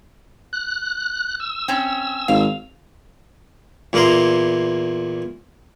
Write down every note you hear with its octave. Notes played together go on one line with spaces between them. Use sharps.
F#6
E6
C4 C#4
G#1 F5
E2 A#2 A#3 E4 A#5 C6